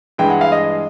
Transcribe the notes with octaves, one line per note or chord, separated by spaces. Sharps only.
G2 E3 G#3 G5
F#5
F5
D#5